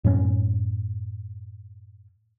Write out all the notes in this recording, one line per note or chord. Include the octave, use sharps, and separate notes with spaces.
F#2 A2 A#3 C#4